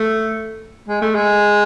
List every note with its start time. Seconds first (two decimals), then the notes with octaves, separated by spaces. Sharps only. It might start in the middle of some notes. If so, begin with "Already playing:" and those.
Already playing: A3
0.88 G#3
1.02 A3
1.15 G#3